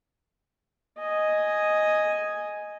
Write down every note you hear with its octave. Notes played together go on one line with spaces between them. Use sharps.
D#5 G#5